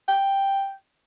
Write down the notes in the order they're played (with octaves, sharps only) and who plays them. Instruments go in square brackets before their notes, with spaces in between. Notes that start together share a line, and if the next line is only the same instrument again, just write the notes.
[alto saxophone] G5